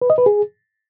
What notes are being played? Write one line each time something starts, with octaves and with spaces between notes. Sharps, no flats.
B4
D#5
B4
G#4